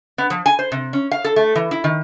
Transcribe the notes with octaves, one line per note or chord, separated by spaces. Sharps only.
B3
F3
G#5
C5
C3
C#4
F5
A4
A3
E3
E4
D#3